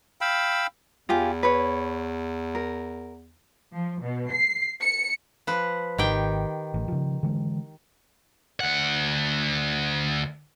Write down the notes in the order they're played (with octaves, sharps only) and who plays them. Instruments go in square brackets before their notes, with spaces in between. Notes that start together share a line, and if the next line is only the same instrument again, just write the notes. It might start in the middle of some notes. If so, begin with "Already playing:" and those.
[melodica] F5 G5 B5 E6
[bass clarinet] E2 [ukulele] F4 G4 G#5
[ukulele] B4 C#5
A#4
[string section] F3
B2
C7
C#7
[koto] F3 B4
[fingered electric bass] G#1 [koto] D#3 G4 G5
[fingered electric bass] A1
C#3 F3
D3 E3 G#3
[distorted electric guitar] D2 F#5